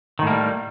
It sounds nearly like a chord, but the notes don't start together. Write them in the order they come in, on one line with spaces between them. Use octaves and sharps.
D#3 A2 A#3 G3